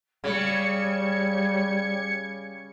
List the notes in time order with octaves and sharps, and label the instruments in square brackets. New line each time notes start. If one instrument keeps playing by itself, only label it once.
[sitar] C#3 [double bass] G3 [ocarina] C#5 [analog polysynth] G#6 C#7